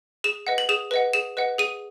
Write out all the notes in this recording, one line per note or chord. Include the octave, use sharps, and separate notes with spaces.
G#4 E7
B4 D#5 F#5
F#7
G#4 E7
B4 D#5 F#5
G#4 E7
B4 D#5 F#5
G#4 D#7